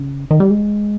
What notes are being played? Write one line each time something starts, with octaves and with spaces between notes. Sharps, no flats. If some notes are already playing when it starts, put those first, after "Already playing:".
Already playing: C#3
D#3
G3
G#3